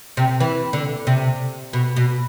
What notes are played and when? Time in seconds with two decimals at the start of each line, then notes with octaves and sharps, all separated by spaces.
0.17 C3
0.40 E3
0.73 D3
1.07 C3
1.73 B2
1.97 B2